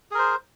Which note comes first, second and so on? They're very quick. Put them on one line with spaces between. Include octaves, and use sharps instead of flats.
G#4 A#4 C5